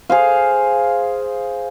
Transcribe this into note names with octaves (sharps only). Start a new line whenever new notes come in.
G#4 C5 F5